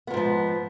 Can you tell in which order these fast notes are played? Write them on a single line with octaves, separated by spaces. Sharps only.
B3 F2 G#2 F3